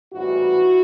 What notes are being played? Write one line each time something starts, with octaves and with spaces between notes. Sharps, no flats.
A1 G#2 E3 G3 E4 F#4